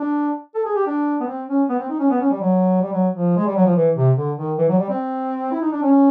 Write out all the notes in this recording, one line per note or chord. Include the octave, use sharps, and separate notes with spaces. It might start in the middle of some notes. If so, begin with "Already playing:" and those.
Already playing: D4
A4
G#4
G4
D4
B3
C4
C#4
B3
C4
D#4
C#4
B3
C#4
G3
F#3
G3
F#3
F3
G#3
G3
F#3
F3
E3
C3
D3
D#3
E3
F#3
G3
C4
E4
D#4
D4
C#4